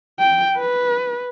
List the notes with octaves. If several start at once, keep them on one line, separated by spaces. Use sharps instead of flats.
G5
B4